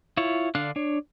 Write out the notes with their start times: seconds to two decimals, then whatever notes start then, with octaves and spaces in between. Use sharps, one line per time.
0.17 E4 F4 C#5
0.55 D3 D4 F5 F#6
0.76 D4 C#5